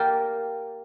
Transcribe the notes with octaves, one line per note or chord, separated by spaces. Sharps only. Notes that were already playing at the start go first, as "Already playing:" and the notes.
Already playing: A#3 G4 A#4 D5